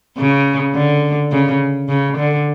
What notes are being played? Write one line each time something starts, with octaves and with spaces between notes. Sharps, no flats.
C#3
D3
C#3
C#3
D3